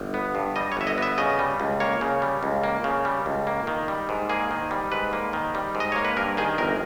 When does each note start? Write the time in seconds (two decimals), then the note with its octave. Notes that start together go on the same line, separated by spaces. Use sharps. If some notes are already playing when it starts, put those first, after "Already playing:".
Already playing: G1
0.14 B3
0.35 G2
0.56 G3 D#5
0.72 C#5
0.77 G1 E5
0.87 D#5
0.98 B3 E5
1.18 C#3 D#5
1.39 G3
1.60 C#2
1.80 A#3 C#5
2.01 C#3
2.22 G3
2.43 C#2
2.64 A#3
2.84 C#3
3.05 G3
3.26 C#2
3.47 A#3
3.67 D#3
3.88 G3
4.09 G#2
4.29 A#3 G#4
4.51 D#3
4.71 G3
4.92 G#2 B4
5.13 A#3
5.33 D#3
5.55 G3
5.75 G#2
5.80 D#5
5.92 A#3 C#5
6.05 B4
6.17 G2 A#4
6.37 D#3 G#4
6.58 G1 A#4